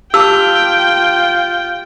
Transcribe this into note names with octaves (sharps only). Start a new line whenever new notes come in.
F4 G4 G5 A5 D6 E6